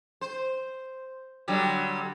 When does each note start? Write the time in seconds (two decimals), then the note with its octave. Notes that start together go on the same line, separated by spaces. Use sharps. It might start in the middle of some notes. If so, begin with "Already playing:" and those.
0.21 C5
1.48 D3 F#3 G3